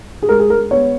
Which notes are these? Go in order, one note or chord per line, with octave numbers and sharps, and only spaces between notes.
G#4
G#3 A#4
G#4
G#3 A#4
B3 C#5